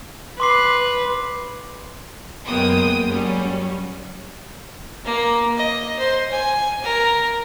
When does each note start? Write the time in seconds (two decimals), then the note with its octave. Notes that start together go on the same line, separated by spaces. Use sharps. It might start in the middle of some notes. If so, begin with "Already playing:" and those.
0.40 B4 C6 D6 C7
2.47 F#2 G#3 A#3 B3 G5 D#6
3.09 F#3 G3 C#4
5.05 A#3
5.57 D#5
5.99 C5
6.31 G#5
6.83 A#4